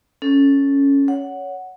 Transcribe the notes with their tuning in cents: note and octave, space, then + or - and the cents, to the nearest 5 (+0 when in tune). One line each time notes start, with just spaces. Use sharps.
C#4 +0 A4 +0
C#5 +20 F#5 +0